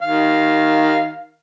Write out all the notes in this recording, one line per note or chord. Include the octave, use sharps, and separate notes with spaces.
D#3 F5